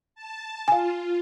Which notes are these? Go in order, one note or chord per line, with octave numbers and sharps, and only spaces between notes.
A5
F4 F5 G#5